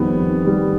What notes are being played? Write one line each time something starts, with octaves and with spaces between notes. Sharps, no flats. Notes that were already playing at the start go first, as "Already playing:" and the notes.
Already playing: F2 D#3 G3 B3
F2
D#3 G3